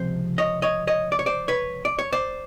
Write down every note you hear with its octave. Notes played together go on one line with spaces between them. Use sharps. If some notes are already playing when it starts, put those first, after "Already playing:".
Already playing: C#2 C3 F3 C4 C5
C#5 D#5
C#5 D#5
C#5 D#5
D5
C#5
C5 D5
B4 C#5
D5
C#5
C5 D5